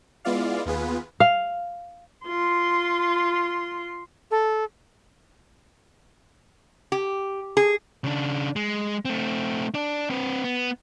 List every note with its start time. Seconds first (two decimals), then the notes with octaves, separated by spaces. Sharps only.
0.25 G#3 B3 E4 F4 D5 F5
0.66 D#2 B3 F4 G#4 B4
1.20 F5
2.27 F4 C6
4.31 A4
6.92 G4
7.57 G#4
8.04 C#3 D4
8.56 G#3
9.05 A3 C4
9.74 D4 D5
10.10 C4 B4
10.44 B3